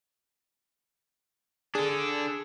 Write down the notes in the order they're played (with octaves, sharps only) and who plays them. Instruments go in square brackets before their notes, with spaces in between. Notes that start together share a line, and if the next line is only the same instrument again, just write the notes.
[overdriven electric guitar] D4 A4 [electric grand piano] G#4